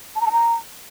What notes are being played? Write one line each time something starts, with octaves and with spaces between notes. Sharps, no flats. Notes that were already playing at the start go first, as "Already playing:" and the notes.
A5
A#5
A5
A#5